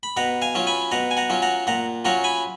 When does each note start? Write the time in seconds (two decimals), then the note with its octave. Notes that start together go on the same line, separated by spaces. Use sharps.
0.03 B5
0.17 B2 F#5 A#5
0.42 F5 G#5
0.55 F#3 C#4 F4
0.67 G#5 B5
0.91 B2 F#5 A#5
1.11 G#5
1.17 F#5 A#5
1.30 F#3 C#4 F4
1.42 F#5 A#5
1.67 A#2 F#5 A#5
2.05 F#3 C#4 F4 F#5 A#5
2.24 G#5 B5